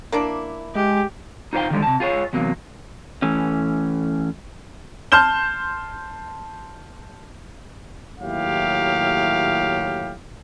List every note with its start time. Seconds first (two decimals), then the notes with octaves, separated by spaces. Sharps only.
0.12 A#3 D4 E4
0.75 G#3 G4
1.53 D#4 F4 C5 D#5 F5 G5
1.70 D3 D#3 F3 G3 G#3
1.82 C3 A5
2.00 F4 G#4 B4 C#5
2.33 E2 C3 F#3 A#3
3.22 E3 A3 C#4
5.12 A5 C6 F6 G6 E7 G7
8.20 D#2 A2 F#3 E4 G4 F5